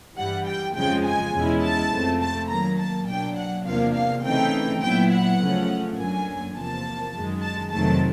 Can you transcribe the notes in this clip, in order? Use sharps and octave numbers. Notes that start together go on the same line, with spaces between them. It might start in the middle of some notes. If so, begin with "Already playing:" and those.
G2 E3 G3 F#5
G5
F2 C#3 F3 G#3 G5
G#5
E2 B2 G#3 C#4 E4
A5
F2 C3 F3 A3 C4
A5
D#3 F#3 A#3 A#5
A5
B2 F#3 A#3 D4 G5
F#5
E2 C3 F3 A#3 D4 F5
F5
C#3 E3 A3 C4 D#4 G5
A#2 F#3 B3 E4 G5
F#5
C#3 F3 A3 C#4
F#2 D3 F#3 A#3 G#5
E2 C3 F3 A#3 A5
F#2 D#3 G#3
A5
F2 C3 D#3 F#3 A3 A5